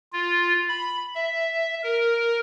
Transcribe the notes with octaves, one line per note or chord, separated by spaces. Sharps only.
F4
B5
E5
A#4